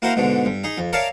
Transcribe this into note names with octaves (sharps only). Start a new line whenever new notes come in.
A#3 E4 F#4 A#4 C5
G#2 B2 D3
G2
D#4 G#4
F2
A#4 C#5 D5 E5 F5 A5